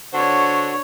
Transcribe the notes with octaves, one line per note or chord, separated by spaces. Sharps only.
D3 D4 F#4 C5 C#5